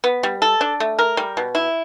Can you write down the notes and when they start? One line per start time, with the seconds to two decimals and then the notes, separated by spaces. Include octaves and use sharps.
0.04 B3
0.23 G3
0.42 A4
0.61 D4
0.80 A3
0.99 A#4
1.17 G3
1.37 B2
1.55 E4